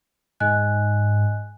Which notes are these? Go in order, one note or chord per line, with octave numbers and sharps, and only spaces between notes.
G#2 D#5 G#5 F#6